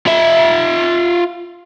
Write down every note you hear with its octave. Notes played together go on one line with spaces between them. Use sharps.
F4 E5